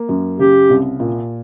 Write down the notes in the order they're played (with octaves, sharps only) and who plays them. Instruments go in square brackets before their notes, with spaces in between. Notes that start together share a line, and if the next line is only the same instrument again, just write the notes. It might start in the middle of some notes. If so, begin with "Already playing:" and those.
Already playing: [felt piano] A#3
F#2
[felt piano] C#3 [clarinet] G4
[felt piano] C2
A#2